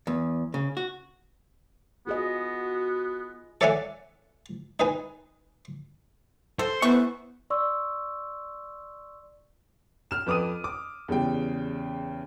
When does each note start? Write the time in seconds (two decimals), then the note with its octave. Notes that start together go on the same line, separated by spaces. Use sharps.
0.07 E2
0.54 C#3
0.77 F#4
2.07 B3 F4 F#4 G#4 D#5
3.61 A4 C#5 D5 E5 F#5 G#5
4.80 D#4 B4 G#5
6.59 A4 C5
6.82 E3 A3 B3 C#6
7.50 D5 C6 C#6 E6
10.11 F6 E7
10.26 F2 B4 D6 D#6 D#7
10.64 D6
11.08 E2 C#3 G3 G5